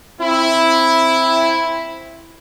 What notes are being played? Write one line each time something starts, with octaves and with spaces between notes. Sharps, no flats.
C4 E4